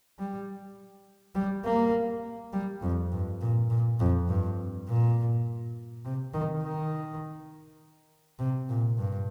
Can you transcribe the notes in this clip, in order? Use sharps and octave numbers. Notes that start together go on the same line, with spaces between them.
G3
G3
A#3
G3
F2
G2
A#2
A#2
F2
G2
A#2
C3
D#3
D#3
C3
A#2
G2